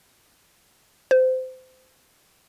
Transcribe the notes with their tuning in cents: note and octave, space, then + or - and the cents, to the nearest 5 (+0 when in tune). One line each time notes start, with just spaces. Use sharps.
C5 -25